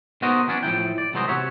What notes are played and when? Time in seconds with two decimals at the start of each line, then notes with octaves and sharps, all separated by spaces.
0.22 B3 D#4 F#4 A#4 C5 D#5
0.47 E3 F#3 C#4 D4
0.63 A2 F3 E4 G5
0.98 D5
1.13 C2 E3 F#3 G#3 C5 D#5
1.28 C3 F#4 C#5 E5